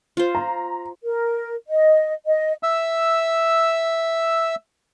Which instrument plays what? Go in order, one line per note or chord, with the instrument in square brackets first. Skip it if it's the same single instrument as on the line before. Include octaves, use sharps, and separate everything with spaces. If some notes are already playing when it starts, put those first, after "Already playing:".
[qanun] F4 C5
[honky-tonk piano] A#5
[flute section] A#4
D#5
D#5
[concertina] E5 E6